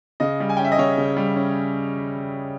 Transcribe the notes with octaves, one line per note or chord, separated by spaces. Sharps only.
C#3 D#5
G3
G#5
C#4 G5
E5
D#5
C#3 C#5
C#3
G3
C#4